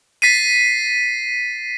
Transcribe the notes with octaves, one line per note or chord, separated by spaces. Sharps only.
A6 B6 C7 D#7